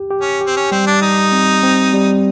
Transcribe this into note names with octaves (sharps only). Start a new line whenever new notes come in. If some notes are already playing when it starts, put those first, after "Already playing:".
Already playing: G4
G4
C#4
G4
C4
C#4
G3 C4
D4
G3 D#4
C4
C4
G3